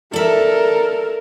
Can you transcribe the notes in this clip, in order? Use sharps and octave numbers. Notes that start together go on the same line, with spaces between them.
A4 A#4 D5 E5